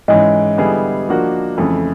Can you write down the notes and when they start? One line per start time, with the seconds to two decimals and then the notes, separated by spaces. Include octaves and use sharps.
0.08 G#2 E3 G#3 C#4 D#5
0.58 D3 G3 B3 E4 G#4
1.08 F3 A#3 D4 F#4
1.58 F2 C#3 E3 A3